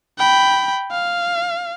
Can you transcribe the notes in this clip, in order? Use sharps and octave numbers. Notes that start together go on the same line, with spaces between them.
G5 B5
F5